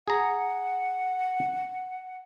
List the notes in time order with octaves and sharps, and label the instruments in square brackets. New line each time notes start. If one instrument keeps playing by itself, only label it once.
[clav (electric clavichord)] G#4 A#5 [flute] F#5